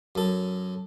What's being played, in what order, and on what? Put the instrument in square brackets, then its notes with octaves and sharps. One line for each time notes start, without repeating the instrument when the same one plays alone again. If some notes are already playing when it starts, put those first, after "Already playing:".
[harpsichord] F#2 A4